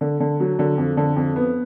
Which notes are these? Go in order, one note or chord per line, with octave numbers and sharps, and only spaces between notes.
D3
D3
F#3
D3
F2
D3
F2
B3